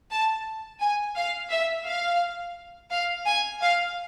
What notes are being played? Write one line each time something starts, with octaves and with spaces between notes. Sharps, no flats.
A5
G#5
F5
E5
F5
F5
G#5
F5